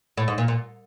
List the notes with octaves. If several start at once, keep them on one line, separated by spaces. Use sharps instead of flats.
A2
G#2
A#2
A#2